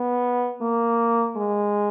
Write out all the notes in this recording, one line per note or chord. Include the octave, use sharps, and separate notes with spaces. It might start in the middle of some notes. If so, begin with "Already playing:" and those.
Already playing: B3
A#3
G#3